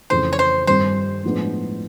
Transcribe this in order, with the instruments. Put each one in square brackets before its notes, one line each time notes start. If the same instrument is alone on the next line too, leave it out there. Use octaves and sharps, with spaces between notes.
[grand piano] F2 C#3 E3 A3 [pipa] C5
[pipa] C#5
C5
[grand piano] G2 D#3 G3 C4 [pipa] C5
[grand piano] A2 F3 G#3 B3 D4